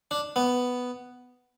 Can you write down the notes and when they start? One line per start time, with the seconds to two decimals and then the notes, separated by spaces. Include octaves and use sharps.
0.11 D4
0.36 B3